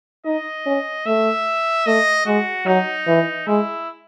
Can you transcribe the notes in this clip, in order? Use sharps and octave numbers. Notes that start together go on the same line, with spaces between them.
D#4 D#5
C#4
A3 E5
A3 D#5
G#3 F#4
F#3 D#4
E3
G#3 E4